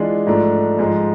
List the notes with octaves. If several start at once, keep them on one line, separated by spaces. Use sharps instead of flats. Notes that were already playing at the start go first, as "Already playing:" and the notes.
Already playing: E3 G#3 D4 F4
G#2 F3 A3 D4
G#2 F3 G#3